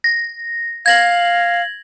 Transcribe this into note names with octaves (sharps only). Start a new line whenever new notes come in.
A#6
F5 G#6 A#6 F#7